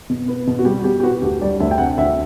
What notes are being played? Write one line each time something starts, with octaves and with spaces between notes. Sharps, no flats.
B2
B3
B2
F#4
G3 G4
B2 G4
G4
B3 F#4
D2 G4
G3 D5
D2 E5
G5
C3 F#5
D2 E5